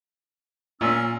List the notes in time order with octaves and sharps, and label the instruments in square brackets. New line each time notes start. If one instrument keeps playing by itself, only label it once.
[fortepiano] A#2 [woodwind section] C#4 E6